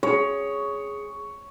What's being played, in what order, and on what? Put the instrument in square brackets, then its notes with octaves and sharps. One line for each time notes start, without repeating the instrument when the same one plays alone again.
[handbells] G#4 [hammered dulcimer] C#5